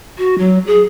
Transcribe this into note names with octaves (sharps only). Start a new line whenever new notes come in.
F#4
F#3
G#4